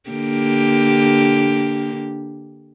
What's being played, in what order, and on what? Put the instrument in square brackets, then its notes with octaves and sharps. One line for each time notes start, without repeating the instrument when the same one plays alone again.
[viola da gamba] D3 A#3 G4